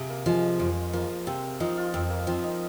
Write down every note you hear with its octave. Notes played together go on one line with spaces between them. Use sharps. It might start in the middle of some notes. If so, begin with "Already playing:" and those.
Already playing: C3 F4 G#4
A#3
F3 G#3
F2
F3 A#3
C3 C4
F3 D#4
F4
F2 C4
A#3
F3 C4
D#4